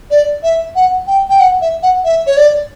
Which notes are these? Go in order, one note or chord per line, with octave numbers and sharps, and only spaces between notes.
D5
E5
F#5
G5
G5
F#5
E5
F#5
E5
C#5
D5